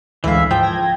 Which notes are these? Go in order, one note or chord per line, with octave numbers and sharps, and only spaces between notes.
A1 D2 E3 G#3 E5 F5
G#2 F3 G5
G#6 A#6